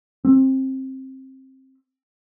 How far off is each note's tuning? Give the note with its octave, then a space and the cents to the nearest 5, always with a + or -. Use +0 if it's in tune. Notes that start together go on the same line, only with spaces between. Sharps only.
C4 +20